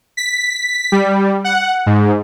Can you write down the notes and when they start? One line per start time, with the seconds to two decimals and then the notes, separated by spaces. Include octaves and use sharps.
0.17 B6
0.92 G3
1.44 F#5
1.86 G#2